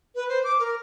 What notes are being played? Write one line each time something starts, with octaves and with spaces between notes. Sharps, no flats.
B4
C5
D6
A#4